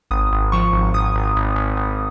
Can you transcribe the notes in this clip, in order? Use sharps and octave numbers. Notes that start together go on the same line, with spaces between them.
G#1 D#6
G#1
F3 C#6
G#1
G#1 D#6
G#1
G#1
G#1
G#1